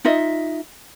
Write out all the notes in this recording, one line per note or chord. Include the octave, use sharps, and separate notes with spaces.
D#4 F4 D#5 E5